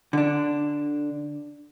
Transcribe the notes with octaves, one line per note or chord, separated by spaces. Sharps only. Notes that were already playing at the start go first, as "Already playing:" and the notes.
D3 D4